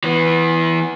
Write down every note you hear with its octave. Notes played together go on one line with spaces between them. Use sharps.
E3 B3